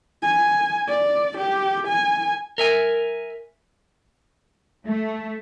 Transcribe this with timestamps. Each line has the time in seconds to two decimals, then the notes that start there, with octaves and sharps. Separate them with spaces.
0.22 G#5
0.88 D5
1.37 G4
1.87 G#5
2.58 A#4 E5 G#5
4.86 A3